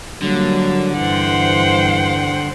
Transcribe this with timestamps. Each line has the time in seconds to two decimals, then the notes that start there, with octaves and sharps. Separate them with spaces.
0.22 D3 F#3 G3 A#3
0.96 G2 E3 C5 F#5 G5